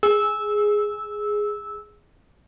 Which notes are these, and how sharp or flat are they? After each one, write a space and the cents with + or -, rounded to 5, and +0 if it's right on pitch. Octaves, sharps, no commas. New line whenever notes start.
G#4 +0 E6 -10